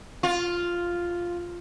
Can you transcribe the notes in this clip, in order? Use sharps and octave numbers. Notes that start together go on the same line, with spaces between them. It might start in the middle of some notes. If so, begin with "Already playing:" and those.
F4